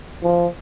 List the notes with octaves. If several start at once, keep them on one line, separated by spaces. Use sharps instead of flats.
F3